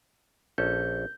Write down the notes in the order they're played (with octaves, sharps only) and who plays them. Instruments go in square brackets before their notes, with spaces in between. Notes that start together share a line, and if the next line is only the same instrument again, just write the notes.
[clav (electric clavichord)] A#1 C#4 A4 [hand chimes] G6